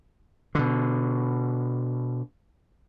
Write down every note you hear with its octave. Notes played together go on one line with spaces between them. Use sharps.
B2 D3